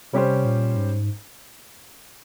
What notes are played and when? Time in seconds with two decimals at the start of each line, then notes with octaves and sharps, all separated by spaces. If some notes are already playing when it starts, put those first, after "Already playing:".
0.13 C3 G3 C#4 G4 C5
0.45 A#2
0.76 G#2